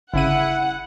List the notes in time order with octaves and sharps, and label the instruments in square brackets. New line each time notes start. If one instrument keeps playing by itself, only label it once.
[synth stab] G1 C#3 D#7 [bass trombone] E4 [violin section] F#5